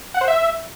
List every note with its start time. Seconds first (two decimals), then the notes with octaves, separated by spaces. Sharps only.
0.14 F#5
0.21 C5
0.28 E5